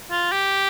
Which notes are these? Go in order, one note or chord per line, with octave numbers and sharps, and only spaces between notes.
F4
G4